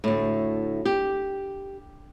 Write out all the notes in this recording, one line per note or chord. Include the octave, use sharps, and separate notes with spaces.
D2 A2
G4